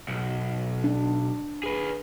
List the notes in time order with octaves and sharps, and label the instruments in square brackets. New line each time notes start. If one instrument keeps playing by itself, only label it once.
[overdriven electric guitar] B1
[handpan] D4
[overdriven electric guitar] G#4 B4